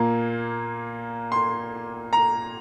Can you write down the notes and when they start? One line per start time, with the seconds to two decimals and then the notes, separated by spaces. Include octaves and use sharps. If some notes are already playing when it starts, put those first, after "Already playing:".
Already playing: A#2 A#3
1.32 C6
2.13 A#5